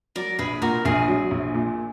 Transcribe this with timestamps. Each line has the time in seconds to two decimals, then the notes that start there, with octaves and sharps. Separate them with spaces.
0.16 F#3 A#4 D5
0.39 A#1 G#4 B4
0.61 A#2 F#4 A#4
0.85 A#1 G#4
1.08 F#3
1.31 A#1
1.54 A#2